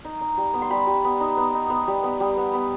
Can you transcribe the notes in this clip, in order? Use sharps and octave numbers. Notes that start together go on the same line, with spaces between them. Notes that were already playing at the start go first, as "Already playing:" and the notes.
D#4
D#4
G3
B3
C6
G3 B5
G3
B3
D#4
B3
D#4
B3
G3
B3
G3
B3
B3